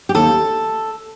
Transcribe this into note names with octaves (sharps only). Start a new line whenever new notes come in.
G4
D#2 A4